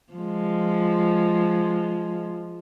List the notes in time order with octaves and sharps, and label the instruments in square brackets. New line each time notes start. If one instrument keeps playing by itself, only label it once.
[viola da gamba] F3 G#3